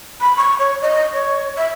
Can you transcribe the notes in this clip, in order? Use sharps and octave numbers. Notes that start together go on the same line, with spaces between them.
B5
C#6
C#5
D#5
C#5
E5